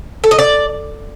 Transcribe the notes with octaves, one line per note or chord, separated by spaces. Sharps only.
A4
D#5
D5